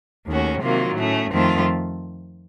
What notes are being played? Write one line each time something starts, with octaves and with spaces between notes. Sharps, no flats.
D#2 D#3 A3 C#4 F#4
C3 D#3 F#3 A#3 F4
A2 A3 C#4
F2 D#3 A3 C4 F4